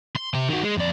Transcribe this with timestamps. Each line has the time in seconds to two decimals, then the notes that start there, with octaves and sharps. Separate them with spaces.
0.16 C6
0.34 C3 G5
0.49 D#3 F#4
0.63 G#3
0.78 F2 D5